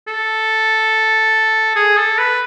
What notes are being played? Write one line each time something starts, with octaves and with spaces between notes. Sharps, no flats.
A4
G#4
A4
B4